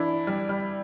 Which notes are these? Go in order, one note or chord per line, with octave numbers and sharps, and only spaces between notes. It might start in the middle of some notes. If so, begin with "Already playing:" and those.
Already playing: E3 D4 E4
G3
G3